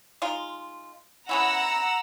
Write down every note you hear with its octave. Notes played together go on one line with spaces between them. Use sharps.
G#3 D#4 F4
B3 C#4 E4 F#5 A#5 E6